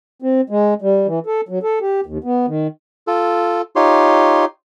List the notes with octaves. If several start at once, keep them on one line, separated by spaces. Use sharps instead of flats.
C4
G#3
G3
E3
A4
F#3
A4
G4
D#2
B3
D#3
F4 A4
D#4 F4 G4 C#5 C6